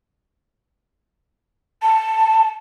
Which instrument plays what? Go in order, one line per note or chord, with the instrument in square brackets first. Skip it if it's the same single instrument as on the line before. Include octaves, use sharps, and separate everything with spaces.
[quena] A5